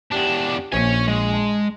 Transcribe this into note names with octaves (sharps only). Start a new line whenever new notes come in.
E2 D4 G4
A#1 A#2 C#5 G#5 C#7
G#3
A5